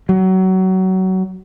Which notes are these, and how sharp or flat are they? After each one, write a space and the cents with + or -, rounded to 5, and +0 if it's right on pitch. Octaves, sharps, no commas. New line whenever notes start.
F#3 +25